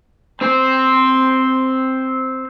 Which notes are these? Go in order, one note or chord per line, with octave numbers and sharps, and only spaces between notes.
C4 C5 C6